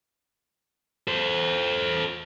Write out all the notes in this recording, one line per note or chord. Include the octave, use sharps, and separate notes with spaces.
A4 C5